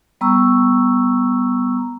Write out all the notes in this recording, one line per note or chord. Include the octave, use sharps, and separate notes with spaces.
G3 B3 A#5 C#6 E6